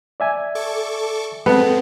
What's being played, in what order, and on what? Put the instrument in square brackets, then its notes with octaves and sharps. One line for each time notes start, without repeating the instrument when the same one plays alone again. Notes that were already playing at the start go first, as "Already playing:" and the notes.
[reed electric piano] D5 E5 G#5
[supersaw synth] A4 C#6 D6
[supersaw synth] G#3 C4 [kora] B3 [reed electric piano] A4